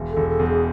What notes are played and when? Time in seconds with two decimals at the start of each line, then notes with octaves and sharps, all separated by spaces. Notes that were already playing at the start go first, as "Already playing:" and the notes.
Already playing: E1
0.10 A4
0.17 E1
0.28 A4
0.39 E2
0.45 G#4